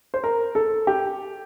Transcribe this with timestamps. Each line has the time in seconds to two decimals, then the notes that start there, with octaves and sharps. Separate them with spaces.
0.14 C5
0.24 A#4
0.55 A4
0.87 G4